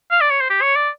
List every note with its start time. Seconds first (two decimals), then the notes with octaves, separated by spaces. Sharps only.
0.11 F5
0.21 D5
0.30 C#5
0.40 C5
0.50 G4
0.62 C#5
0.76 D5